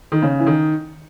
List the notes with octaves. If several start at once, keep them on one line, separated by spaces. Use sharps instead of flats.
D#3
C#3
E3
D#3